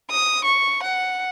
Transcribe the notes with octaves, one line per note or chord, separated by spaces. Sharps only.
D#6
C#6
F#5